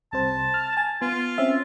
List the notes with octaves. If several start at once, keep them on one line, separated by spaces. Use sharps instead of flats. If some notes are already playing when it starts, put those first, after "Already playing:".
C2 C3 C5 A5
F6
G#5 A6
B3 F4
C4 C#4 E5